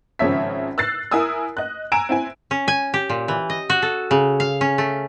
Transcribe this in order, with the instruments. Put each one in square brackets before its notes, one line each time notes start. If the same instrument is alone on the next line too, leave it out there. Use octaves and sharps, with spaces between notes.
[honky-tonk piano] G#1 C#3 F3 C#5 E5 B6
E6 F#6 A6 C7
E4 A#4 G#5 D#6 E6
D#5 F#6
G#5 A#5 E6 D7 E7
C4 E4 G#5
[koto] C#4
G#5
G4
A#2
E3
D#5
F#4
A4
C#3
F5
C#4
A3